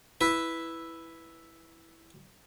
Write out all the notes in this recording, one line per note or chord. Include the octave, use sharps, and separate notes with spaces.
E4 B4